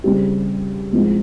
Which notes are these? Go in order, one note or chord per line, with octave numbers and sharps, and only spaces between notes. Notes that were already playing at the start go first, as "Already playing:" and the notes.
C#3 G3 C4 G4
G#2 F3 C4